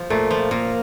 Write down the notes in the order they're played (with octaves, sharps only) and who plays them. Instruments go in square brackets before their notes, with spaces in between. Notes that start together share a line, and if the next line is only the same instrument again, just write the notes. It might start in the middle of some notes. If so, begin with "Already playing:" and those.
Already playing: [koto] F3
[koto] A#2 [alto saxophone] A3
[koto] F3
[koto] A#2 [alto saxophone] A#3